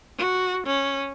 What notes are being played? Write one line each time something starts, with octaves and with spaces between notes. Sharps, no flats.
F#4
C#4